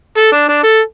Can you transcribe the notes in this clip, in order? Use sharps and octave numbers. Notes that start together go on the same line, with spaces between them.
A4
D4
D4
A4